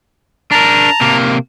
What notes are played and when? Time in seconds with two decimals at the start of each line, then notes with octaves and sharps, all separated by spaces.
0.51 D4 A#4 A5 A#5
1.01 C3 A#3